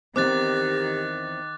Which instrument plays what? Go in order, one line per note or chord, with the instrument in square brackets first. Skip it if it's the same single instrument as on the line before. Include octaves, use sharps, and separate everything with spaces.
[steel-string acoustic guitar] E2 G#2 C4 [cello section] D#3 [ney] G4 [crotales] D6 F#6 A6